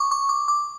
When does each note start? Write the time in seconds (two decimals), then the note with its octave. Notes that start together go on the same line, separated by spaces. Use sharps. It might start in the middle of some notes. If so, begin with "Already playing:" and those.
Already playing: C#6 D6
0.11 C#6
0.29 D6
0.48 D6